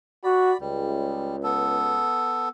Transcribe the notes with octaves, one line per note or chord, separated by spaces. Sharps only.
F#4 D5 B5
C#2 G3
B3 A4